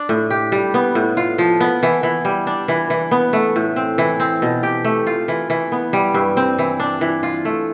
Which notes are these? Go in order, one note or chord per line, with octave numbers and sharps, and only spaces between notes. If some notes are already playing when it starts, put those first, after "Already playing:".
Already playing: D4
A2
G4
G3
B3
A2
F4
F3
B3
E3
E3
G3
D4
E3
E3
B3
A3
A2
C4
E3
C4
B2
G4
A3
F4
E3
E3
B3
G3
G2
C4
E3
D4
E3
F4
A3